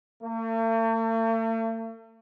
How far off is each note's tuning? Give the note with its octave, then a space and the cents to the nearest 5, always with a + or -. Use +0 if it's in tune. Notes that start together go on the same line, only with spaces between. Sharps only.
A3 +45